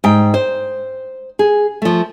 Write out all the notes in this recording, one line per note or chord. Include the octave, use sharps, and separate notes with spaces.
G#2 G5
C5
G#4
F3 A3